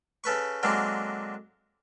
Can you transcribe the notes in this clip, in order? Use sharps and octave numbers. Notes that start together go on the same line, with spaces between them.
C#3 A4 B4 C#6
D3 F#3 G#3 A#3 C4